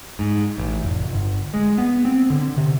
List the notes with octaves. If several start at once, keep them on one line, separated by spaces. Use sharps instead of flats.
G#2
A1
F1
G1
G#3
B3
C4
D3
C3